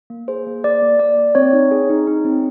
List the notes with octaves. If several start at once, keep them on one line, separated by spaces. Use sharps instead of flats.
A#3
G#4 C5
A#3
A#3 D5
A#3
A#3 D5
A#3
C4 C#5
D#4
G#4
D#4
D#4
C4